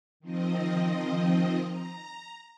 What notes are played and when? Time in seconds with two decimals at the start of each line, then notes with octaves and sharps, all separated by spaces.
0.20 D#3 F3 C4 D#5
1.63 A#5